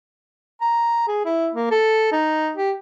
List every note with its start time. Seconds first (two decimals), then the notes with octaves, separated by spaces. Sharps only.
0.61 A#5
1.08 G#4
1.25 E4
1.54 A#3
1.71 A4
2.12 D#4
2.57 G4